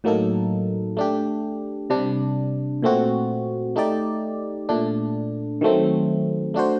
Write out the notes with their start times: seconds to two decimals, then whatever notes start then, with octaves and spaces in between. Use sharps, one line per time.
0.04 A2 F#3 A#3 D#4 A4
0.97 A3 D4 G4
1.90 C3 G3 D4
2.82 A#2 A3 C4 F#4
3.76 A3 D#4 G4 D5
4.69 A#2 A3 D4
5.61 D#3 F#3 A3 C4
6.54 A3 D4 F#4 C5